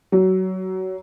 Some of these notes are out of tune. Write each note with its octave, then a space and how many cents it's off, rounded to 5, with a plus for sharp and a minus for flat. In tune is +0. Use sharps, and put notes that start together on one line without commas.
F#3 +20